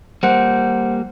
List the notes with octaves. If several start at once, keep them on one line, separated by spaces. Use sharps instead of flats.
G3 A#3 C5 F#5 F#6